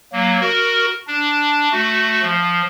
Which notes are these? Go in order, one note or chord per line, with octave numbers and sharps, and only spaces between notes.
F#3 A#3
F#4 A#4
D4
A3 F#4
F3